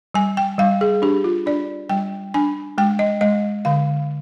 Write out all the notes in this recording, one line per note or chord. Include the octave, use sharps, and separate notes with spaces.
G3 G#5
G5
G3 F5
G#4
D4 G4
F4
D4 D5
G3 G5
D4 G#5
G#3 G5
D#5
G#3 D#5
D3 F5